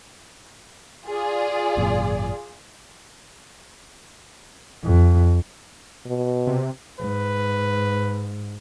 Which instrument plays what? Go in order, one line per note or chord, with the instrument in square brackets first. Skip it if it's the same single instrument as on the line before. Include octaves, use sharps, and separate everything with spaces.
[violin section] F4 G#4 D5
[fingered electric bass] G#1 F#2 A#2
[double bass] F2
[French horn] B2
[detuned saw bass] C3
[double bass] G#2 [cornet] B4